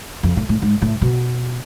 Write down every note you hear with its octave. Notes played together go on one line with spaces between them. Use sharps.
F2
A2
A2
G#2
A2
B2